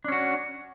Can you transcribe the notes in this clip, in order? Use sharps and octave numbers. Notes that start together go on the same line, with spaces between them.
C#4 D4 F#4